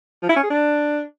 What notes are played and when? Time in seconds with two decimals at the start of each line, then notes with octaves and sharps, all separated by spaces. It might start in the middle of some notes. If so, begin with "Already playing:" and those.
0.22 F3
0.29 E4
0.36 C#4
0.43 G#4
0.50 D4